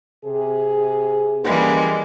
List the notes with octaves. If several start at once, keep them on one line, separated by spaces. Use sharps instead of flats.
C3 G#4
E3 G3 G#3 A#3 C#4 B4